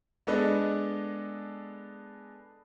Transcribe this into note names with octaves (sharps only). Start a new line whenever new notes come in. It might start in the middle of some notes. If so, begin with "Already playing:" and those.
G#3 B3 D4 A4 B4 D#5